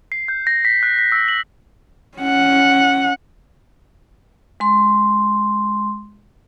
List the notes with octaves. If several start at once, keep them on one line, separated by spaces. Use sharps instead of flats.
C7
G6
A#6
B6
F#6
B6
E6
F#7
C#4 F#5
G#3 C6